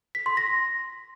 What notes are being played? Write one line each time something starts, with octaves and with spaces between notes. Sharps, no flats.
B6
C6
A#6